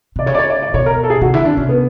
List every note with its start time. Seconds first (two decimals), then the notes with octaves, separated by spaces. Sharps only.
0.16 C3 D5
0.26 C#3 C#5
0.34 D5
0.38 C#5
0.50 D5
0.62 D5
0.74 B2 C#5
0.86 A#4
1.03 A4
1.10 G#4
1.21 C3 F#4
1.34 D3 E4
1.45 C3 D4
1.57 C3 C#4
1.69 B3